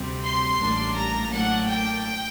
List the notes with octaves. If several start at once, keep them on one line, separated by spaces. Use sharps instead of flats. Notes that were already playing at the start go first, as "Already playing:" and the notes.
Already playing: D2 C3 G3 C4
C6
A1 A2 G3 A#3 D4
A#5
A2 F#3 A#3 D4 F#5
G5